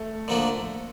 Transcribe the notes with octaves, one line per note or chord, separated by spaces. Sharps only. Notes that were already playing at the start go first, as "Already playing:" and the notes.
Already playing: A3
D3 F3 A#3 D4